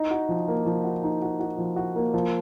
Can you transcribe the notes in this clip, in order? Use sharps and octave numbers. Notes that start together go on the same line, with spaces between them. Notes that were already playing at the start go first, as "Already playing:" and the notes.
Already playing: D#4
F#4
F3
A#3
F3
F#4
D#4
F#4
F#4
F3
F#4
A#3
F3